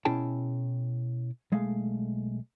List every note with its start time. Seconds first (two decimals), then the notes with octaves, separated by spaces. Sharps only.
0.05 B2 C#4 E4 G#4 G5 A5
1.52 B1 G#3 A3 F5